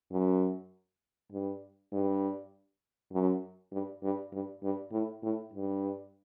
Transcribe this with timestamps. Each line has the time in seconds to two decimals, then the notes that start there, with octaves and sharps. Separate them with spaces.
0.12 F#2
1.32 G2
1.92 G2
3.12 F#2
3.72 G2
4.03 G2
4.33 G2
4.63 G2
4.92 A2
5.23 A2
5.53 G2